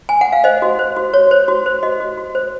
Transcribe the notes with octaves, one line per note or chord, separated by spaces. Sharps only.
G#5
F#5
F5
C5 D#5
F#4
C5
F#4
F#4 C#5
C5
F#4
C5
F#4 D#5
F#4
F#4
C5